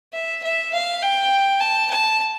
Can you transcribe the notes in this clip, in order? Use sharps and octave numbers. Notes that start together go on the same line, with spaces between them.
E5
E5
F5
G5
A5
A5